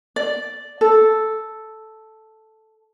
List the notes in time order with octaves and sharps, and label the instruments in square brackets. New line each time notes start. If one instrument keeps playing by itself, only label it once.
[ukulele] D5
A4